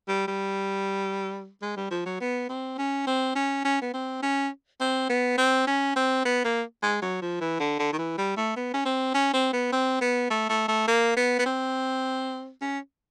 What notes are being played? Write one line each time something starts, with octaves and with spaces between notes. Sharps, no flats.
G3
G3
G#3
G3
F3
F#3
B3
C4
C#4
C4
C#4
C#4
B3
C4
C#4
C4
B3
C4
C#4
C4
B3
A#3
G#3
F#3
F3
E3
D3
D3
D#3
E3
G3
A3
B3
C#4
C4
C#4
C4
B3
C4
B3
A3
A3
A3
A#3
B3
B3
C4
C#4